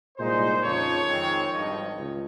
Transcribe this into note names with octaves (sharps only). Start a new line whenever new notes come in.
C2 A#2 G#3 D#4 C5
F2 C#3 F3 A#3 D#4 C#5
F2 D#3 G#3 C4
G#1 G2 F3 D#5
C#2